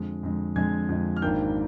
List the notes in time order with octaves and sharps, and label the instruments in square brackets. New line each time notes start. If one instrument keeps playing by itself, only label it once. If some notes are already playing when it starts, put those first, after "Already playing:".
Already playing: [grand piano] F2 D3 G#3
F2 D3 G#3
F2 D3 G#3 G#5 G#6
F2 D3 G#3
F6
G#1 G#2 D#3 A#3 D4 G5 G6